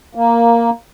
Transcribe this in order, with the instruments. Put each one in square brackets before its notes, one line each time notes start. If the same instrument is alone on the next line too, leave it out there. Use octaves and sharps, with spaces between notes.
[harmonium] A#3